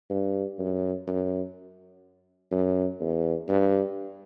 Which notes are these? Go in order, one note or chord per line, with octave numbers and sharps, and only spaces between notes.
G2
F#2
F#2
F#2
E2
G2